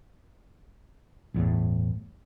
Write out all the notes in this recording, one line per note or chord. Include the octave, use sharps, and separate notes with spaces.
G1 E2 A2